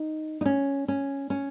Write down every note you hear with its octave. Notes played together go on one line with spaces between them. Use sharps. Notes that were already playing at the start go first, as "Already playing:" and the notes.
Already playing: D#4
D#4
C#4
C#4
C#4